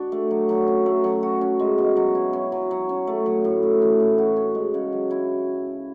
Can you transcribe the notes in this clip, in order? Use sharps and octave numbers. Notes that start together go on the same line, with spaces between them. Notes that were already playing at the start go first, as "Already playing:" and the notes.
Already playing: D4 F#4
A3
F#3
F#3
C#4
A3
F#3
F#4
C#4
G#3
B2
F#3
E4
C#4
F#3
F#3
C#4
A3
F#3
A2
A3
E3
A2
F#4
C#4
G#3
C#3
F#3
E4